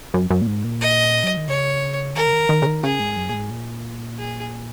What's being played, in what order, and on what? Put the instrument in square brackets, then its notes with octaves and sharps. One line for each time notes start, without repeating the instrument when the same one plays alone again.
[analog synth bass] F#2
F#2
A#2
G#2
A#2
[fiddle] D#5
[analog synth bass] F#3
D#3
[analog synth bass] C#3 [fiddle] C#5
[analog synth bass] D#3 [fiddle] A#4
[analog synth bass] C#3
D#3
D#3
C#3
D#3
[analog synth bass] C#3 [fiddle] G#4
[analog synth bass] G#2
F#2
A#2
G#2
A#2
[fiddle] G#4